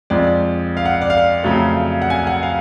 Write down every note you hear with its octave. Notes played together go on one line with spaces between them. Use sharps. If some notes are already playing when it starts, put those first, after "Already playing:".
F2 F3 G#3 D5
F5
F#5
D5
F5
F2 C#3 F#3 A3
F#5
G#5
F#5
F5